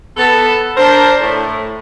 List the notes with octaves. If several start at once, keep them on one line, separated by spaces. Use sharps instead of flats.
B3 A4
D4 A#4 C5
A2